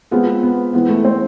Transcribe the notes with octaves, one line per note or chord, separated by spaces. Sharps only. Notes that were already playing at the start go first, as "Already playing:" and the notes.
G#3 B3 C4 F4 G#4
B3
B3
E3 G#3 B3 C4
A3
C4